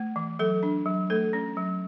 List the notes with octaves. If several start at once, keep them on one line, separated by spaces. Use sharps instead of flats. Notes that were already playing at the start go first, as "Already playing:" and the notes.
Already playing: A3
E3
F#3 A4
D4
F#3
A3 A4
C#4
F#3